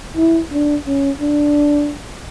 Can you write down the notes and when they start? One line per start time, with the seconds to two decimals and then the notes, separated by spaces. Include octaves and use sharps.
0.17 E4
0.52 D4
0.87 C#4
1.21 D4